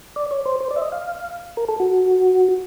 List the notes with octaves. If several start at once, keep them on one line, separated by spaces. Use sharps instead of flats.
D5
C#5
C5
C5
D5
E5
D#5
F5
A#4
A4
F#4